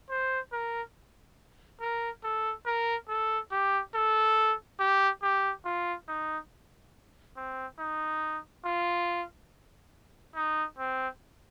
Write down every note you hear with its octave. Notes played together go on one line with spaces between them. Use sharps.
C5
A#4
A#4
A4
A#4
A4
G4
A4
G4
G4
F4
D#4
C4
D#4
F4
D#4
C4